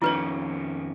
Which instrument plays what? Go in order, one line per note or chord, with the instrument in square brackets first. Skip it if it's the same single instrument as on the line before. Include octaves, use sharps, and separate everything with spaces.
[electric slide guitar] F2 D#3 C#4 [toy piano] E4 B4 C#5